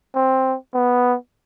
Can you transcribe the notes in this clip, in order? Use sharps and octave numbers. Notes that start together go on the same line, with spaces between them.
C4
B3